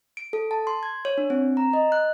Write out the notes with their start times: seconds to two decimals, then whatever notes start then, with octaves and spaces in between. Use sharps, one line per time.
0.17 D7
0.33 A4
0.51 A5
0.67 C6
0.83 G#6
1.05 C#5
1.18 D4
1.30 C4
1.57 A#5
1.73 D#5
1.92 F#6